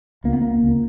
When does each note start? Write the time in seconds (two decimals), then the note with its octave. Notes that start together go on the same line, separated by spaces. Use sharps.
0.24 C#2 A#3
0.33 B3
0.42 A#3
0.63 C#2